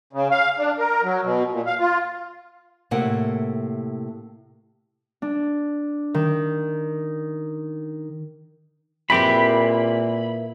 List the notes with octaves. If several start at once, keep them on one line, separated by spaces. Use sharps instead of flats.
C#3
F5
D4
A#4
F#3
B2
A#2
F5
F4
A2 C3 A#3 F#5
D4
D#3
A#2 G#3 C4 E4 G4 A#4 B4 B5